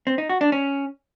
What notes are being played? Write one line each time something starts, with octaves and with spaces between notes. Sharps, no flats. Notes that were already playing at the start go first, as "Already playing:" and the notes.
C4
D#4
F#4
D4
C#4